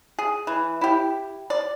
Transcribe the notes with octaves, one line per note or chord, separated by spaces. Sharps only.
G#4
E3
E4 G4
D5